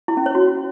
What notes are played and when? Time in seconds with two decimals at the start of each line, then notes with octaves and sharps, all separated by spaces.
0.08 E4
0.17 C#4
0.26 C#5
0.35 F#4